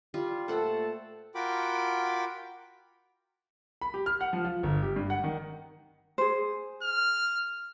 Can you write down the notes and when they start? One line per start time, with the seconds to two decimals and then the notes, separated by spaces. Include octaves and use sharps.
0.14 G3 F4
0.48 A#2 A3 A4 C5 F#5 G5 A5
1.35 F4 F#4 A#4 G5 B5 D6
3.81 B5
3.94 G4
4.06 F6
4.21 F#5
4.33 F3
4.45 F4
4.63 G1
4.83 G4
4.96 G2
5.10 F#5
5.24 D#3
6.18 G#4 C5
6.82 F6